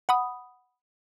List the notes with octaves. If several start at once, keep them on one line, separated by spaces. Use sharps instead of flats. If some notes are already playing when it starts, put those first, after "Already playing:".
F#5 B5 D#6